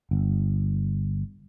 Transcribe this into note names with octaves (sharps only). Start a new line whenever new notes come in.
G1